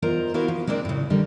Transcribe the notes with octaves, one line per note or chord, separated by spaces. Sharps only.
E2 F4 A#4 C5 D#5 A#5
B3 E4 F#4 A#4 C5 F5
F3
G#3 A#3 C4 D4 A#4
A2 C#3
D3 G3 A#4